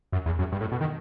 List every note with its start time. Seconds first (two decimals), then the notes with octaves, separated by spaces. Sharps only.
0.12 F#2
0.26 E2
0.39 F#2
0.52 G2
0.61 A2
0.72 B2
0.81 D#3